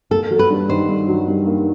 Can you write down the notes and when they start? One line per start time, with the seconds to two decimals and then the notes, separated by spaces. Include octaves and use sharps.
0.11 A#3 A4
0.31 F#3
0.39 B4
0.50 G2
0.69 D#3 C5
0.89 G2
1.08 F#3
1.28 G2
1.47 A#3